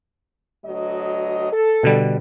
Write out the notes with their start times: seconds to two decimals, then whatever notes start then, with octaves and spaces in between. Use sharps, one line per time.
0.65 D2 F#3 D#5
1.52 A4
1.83 B2 D3 G3